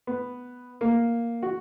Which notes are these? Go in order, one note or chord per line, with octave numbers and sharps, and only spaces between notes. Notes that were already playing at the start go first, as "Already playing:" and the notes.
B3
A#3
F#4